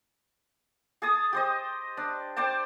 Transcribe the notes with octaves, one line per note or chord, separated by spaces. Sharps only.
G#4 A5 D#6
G4 C5 D#5
D4
C5 D5 G5 A5